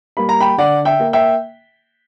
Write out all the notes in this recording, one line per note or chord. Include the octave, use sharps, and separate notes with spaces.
G3 A#3 B5
A#5
G5 B5
D3 D5 F#5
E5 G5
A#3
E5 G5